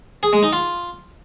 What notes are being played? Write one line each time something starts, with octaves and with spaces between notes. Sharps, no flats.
G#4
G#3
D#4
F4